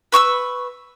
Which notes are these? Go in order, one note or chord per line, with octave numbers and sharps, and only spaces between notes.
B4 C#6 D#6 E6